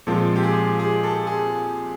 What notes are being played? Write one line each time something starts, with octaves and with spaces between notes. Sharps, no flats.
A#2 F3 G#3 C4 F4 A4
G4
G#4
G#4
A4
G#4